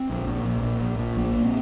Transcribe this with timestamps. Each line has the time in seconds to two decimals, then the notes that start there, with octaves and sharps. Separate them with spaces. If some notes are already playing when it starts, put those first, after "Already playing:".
Already playing: C4
0.09 A#1
0.27 A#2
0.45 A#1
0.62 A#2
0.81 A#1
0.99 A#2
1.17 A#1 A#3
1.35 A#2
1.43 C4